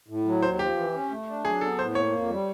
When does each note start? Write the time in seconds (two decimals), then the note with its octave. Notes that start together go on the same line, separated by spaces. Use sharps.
0.08 A2
0.25 F#3
0.42 D#2 C5
0.59 F3 G4
0.77 E3
0.93 C#4
1.10 A3
1.27 D4
1.44 F#3 G#4
1.61 B3 A4
1.79 A2 C5
1.95 A#3 C#5
2.12 F2
2.29 G3